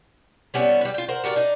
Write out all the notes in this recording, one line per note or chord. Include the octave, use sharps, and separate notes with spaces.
G3 B3 C#4 E4
G3 B4
F4 G5
A#4 C5 F#5
F#4 G4 A#4 D5
D4 D#4